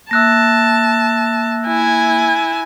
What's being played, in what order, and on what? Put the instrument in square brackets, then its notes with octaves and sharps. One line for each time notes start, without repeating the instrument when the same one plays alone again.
[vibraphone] A#3 E5 [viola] A5 [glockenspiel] E6 F#6 A#6
[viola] E4 G#5